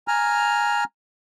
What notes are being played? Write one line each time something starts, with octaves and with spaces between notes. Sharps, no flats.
G#5 A#5 F6